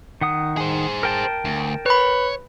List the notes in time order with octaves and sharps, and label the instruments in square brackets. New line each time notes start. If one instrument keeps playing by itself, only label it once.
[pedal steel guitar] D#3 F#5 D#6
[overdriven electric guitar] G#4 C5
[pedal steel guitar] A#4 G5 A5
[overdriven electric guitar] D2
[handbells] B4 B5 [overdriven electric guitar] C#5